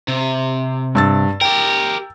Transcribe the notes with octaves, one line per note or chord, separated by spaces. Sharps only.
C3
G2 E6 A6
G4 A#4 G5